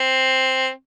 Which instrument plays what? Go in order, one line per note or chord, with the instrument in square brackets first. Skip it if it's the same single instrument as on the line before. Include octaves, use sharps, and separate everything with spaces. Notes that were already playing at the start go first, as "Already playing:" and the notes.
Already playing: [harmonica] C4